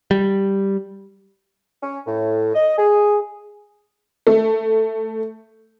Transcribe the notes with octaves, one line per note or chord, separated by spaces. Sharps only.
G3
C#4
A2
D#5
G#4
A3